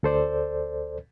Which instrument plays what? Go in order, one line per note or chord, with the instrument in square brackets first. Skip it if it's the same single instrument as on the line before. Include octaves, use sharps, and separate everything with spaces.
[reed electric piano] D2 A4 C5 D5